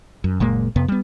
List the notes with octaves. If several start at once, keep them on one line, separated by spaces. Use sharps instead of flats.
F#2
F#1 A#2 G#3 A#3
F2 C3 B3
G3 B3